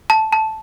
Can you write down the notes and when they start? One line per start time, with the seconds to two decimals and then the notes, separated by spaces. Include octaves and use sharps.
0.10 A5
0.32 A5